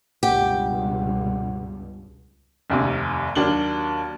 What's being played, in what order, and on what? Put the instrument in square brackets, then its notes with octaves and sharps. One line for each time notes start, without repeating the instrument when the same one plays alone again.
[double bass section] C#2 G2 B2 [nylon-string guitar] G4 [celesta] F#5
[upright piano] F1 D#2 C3
D#2 F#3 A#3 D4 F#7 G7